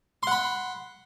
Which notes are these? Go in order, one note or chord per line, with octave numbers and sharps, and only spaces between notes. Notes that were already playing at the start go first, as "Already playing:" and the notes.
F#5 B5 C6